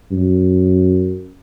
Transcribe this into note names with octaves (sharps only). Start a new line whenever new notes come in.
F#2